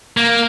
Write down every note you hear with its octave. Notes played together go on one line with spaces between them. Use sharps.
A#3